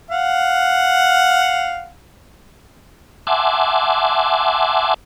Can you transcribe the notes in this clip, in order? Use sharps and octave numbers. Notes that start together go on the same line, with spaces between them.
F5 F#5
E5 F#5 G#5 A5 C6 D6